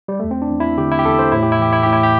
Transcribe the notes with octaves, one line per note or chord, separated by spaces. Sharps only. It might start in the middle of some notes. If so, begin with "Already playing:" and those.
G3
E2 A3
C4
D4
E2
E4
D3 G4
E4
G4
E2 A4
C5
A2 E4
G4
E4
E3 G4
E4
A2 G4
E4
G4